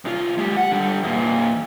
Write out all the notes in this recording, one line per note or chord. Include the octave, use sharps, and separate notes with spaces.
C2 F4
G#3 G4
F#5
D3 G3
E2 A#2